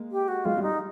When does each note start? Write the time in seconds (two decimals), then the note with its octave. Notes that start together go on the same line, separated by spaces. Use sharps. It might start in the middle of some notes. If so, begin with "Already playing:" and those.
Already playing: G#3 A#3
0.12 G4
0.28 F#4
0.45 F#3 G#3 F4
0.57 G3
0.63 D#4